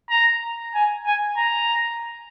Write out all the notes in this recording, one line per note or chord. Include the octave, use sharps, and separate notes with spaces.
A#5
G#5
G#5
A#5